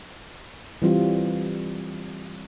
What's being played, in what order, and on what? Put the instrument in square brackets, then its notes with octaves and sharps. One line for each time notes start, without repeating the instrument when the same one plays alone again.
[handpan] E3 G3 C4 F4